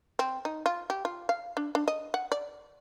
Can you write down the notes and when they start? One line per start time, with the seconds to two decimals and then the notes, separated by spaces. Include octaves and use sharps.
0.19 C4
0.45 D#4
0.66 F4
0.90 G4
1.05 F4
1.29 F5
1.57 D4
1.75 D4
1.88 D#5
2.14 F#5
2.32 D5